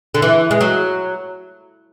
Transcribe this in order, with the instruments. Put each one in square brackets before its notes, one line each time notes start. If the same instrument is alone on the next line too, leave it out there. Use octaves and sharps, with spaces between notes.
[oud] D3
E3
G#3
F#3